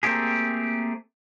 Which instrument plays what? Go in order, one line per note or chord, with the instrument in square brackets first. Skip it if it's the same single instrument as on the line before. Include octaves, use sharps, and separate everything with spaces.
[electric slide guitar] A3 A#3 C4 E4 G4 G#4